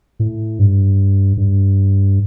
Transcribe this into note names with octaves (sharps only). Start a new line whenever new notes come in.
A2
G2
G2